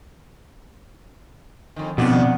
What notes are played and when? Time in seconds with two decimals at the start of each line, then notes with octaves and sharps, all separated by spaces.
1.76 F2 D#3
1.98 F2 B2 D#3 B3 D4 D5